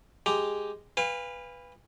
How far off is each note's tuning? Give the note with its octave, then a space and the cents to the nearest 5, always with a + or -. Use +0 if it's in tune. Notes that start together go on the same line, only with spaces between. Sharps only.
G#3 +0 G4 +0 A#5 +0
B4 +0 F5 -5 G#5 -40